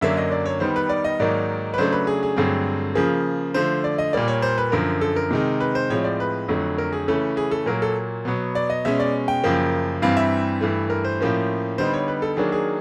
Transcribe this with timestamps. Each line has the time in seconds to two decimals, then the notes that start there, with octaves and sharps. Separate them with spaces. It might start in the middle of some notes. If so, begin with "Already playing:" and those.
0.01 F#2 D3 F#3 A#3 D4 E5
0.17 D#5
0.32 D5
0.45 C#5
0.60 D#3 G3 B3 D#4 C5
0.76 B4
0.89 D5
1.04 D#5
1.20 G#2 D#3 F#3 A#3 D#4 D5
1.74 B4
1.78 C#3 F#3 A3 D4 C5
1.92 B4
2.07 G#4
2.23 G#4
2.37 G2 D3 F#3 A3 C4
2.95 C#3 F3 A#3 G#4
3.54 D3 F3 A3 C5
3.84 D5
3.98 D#5
4.13 A#2 G3 A#3 D5
4.28 C#5
4.42 C5
4.58 B4
4.72 F#2 D3 F3 A#4
5.01 A4
5.16 A#4
5.31 C3 D#3 G#3
5.60 B4
5.75 C5
5.90 A2 F3 G#3 C4 C#5
6.04 D5
6.20 B4
6.48 F2 D3 F#3 A3
6.78 A#4
6.93 G#4
7.07 C#3 E3 A3 C#4 A4
7.37 G#4
7.51 A4
7.66 A#2 F#3 A#3 A#4
7.82 A4
8.25 B2 F#3 B3
8.55 D5
8.70 D#5
8.85 B2 G#3 C#4 E5
9.00 D5
9.28 G5
9.44 F#2 C#3 F3 A#3
10.02 G2 E3 G3 C4 F5
10.17 E5
10.61 G2 E3 A3
10.90 A#4
11.05 C5
11.20 A2 F3 A#3 C#4
11.78 D3 G3 B3 D#4 C5
11.94 C#5
12.08 B4
12.22 A4
12.37 D#3 F#3 A#3 D4 G#4
12.52 G#4